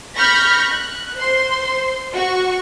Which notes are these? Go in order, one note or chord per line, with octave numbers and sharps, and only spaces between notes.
B5 C#6 F6 G6 A#6 B6
F#6
C5 C6
F#4 C#6